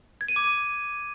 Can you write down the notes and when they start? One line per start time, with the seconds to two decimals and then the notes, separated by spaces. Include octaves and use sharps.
0.21 G#6
0.28 D#7
0.36 D6
0.44 D#7